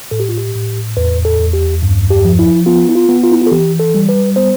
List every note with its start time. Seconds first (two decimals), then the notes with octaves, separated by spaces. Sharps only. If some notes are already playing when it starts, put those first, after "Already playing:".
0.11 A2 A4
0.20 G4
0.29 F4
0.38 G4
0.55 A2
0.97 E2 B4
1.25 A4
1.40 E2
1.53 G4
1.82 G2
2.10 G4
2.25 F3
2.39 E4
2.66 B3 F4
2.89 E4
2.95 F4
3.09 B3
3.24 F4
3.32 E4
3.41 F4
3.47 A4
3.51 E3 G4
3.79 A4
3.95 G3
4.09 B4
4.36 B3 C5